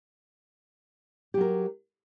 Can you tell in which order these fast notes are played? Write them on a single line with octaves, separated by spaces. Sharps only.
G4 F#3 A#4